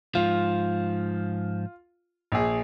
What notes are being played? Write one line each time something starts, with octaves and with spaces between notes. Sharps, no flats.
G#2 F3 F4
A#1 G#4